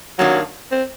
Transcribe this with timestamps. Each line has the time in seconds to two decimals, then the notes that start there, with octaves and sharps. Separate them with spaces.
0.19 F#2 D#3 F#3 G3 A#3 D4
0.71 C4